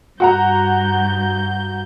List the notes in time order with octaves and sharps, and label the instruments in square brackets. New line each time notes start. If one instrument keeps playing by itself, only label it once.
[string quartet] G2 G6 [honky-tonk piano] F#4 F#5 A#5